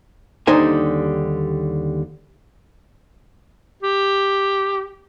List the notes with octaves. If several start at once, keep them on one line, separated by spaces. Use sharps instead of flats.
D#2 D3 G3 D#4 C5 G#5
G4